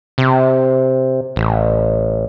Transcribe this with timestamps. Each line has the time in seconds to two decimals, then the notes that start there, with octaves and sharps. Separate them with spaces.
0.18 C3
1.36 A1